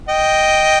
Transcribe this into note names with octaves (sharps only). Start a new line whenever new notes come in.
D#5 G5